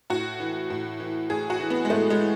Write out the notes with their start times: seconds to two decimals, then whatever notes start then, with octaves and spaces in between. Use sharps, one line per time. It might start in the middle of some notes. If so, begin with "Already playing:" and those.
0.10 A2 F#4
0.40 E3
0.70 A2
1.00 E3
1.30 A2 G#4
1.50 F#4
1.60 E3
1.70 B3
1.85 G#3
1.90 A2 A3
2.10 G#3
2.19 E3